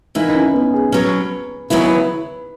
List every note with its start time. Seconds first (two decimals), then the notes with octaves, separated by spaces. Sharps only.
0.15 E3 A#3 D#4 E4 B4
0.29 D#4
0.35 C#4
0.54 B3
0.74 G#4
0.92 B2 F#3 C#4 B4
1.70 D#2 C#3 F#3 B3 E4 B4